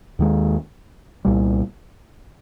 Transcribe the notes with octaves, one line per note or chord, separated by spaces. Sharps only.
D#2 D#3 G#3
C2 A#2 G3